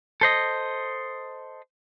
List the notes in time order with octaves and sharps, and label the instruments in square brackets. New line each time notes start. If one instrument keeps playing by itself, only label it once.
[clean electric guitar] A4 C5 D#5